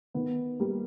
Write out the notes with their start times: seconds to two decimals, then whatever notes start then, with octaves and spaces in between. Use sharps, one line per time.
0.14 D#3 B3
0.59 G3 A#3